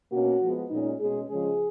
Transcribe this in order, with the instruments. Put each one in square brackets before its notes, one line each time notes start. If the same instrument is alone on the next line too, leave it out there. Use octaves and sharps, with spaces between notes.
[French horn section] B2 A#3 C#4 F#4
F3 G#3 B3
A#2 G#3 C#4 D#4
B2 G#3 C#4 G#4
C#3 F3 G#3 C#4 G#4